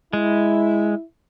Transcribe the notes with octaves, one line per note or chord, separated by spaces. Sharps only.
G#3 E4